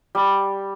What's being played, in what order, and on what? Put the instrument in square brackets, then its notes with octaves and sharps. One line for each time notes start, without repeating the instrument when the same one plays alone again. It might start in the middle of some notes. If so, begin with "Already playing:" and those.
[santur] G3